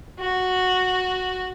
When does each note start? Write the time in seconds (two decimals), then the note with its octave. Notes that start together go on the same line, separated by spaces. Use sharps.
0.19 F#4